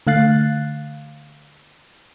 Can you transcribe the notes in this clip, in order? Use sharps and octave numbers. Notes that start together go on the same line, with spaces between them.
D3 A3 F5 F#6 A6 C7